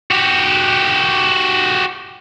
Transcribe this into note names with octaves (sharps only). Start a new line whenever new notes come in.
F#4 G4